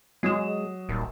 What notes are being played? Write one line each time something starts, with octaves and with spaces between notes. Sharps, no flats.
F#3 G#3 D#6 E7
D#1